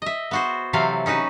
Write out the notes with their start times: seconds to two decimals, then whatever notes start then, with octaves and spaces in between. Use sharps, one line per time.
0.02 D#5 E5
0.31 B3 F#4 C5
0.73 C3 E3 F#3 C4 A4 F5
1.06 C#4 D#4 F#4 B4